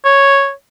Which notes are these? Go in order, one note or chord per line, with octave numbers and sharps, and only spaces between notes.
C#5